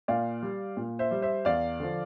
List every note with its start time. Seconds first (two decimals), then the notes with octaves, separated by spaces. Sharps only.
0.08 A#2 D5 F5
0.43 G3
0.77 A#2
0.99 C5 E5
1.11 G3
1.22 C5 E5
1.45 E2 D5 F5
1.80 D3 F3